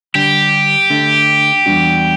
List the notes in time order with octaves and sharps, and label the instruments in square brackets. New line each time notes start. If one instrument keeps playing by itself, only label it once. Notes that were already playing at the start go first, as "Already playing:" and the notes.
[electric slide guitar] D3 G3 D4 [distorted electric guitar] G4
[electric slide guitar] D3 A3 D4
E2 B2 G3 D4 F#4